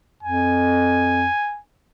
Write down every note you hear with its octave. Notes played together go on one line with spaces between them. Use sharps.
F2 G#5